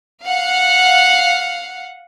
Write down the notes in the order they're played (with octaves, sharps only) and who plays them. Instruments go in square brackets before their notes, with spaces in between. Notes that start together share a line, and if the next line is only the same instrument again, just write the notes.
[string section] F5 F#5